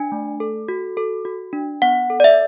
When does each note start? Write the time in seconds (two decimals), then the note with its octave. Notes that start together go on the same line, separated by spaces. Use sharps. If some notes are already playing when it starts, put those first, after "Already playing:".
Already playing: D4 G#5
0.12 A3
0.40 A4
0.68 F#4
0.97 A4
1.25 F#4
1.53 D4
1.82 B3 F#5
2.10 A4
2.20 D5
2.24 E5